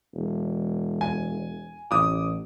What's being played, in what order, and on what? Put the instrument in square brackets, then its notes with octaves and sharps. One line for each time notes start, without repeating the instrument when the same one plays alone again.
[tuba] E1
[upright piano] G#5
[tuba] A1 [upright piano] D6 D#6